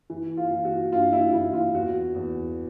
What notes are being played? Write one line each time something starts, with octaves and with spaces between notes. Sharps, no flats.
E3
F4
E3
F#4
G2 F4
E4
E3 E4
F4
E2 F#4
E2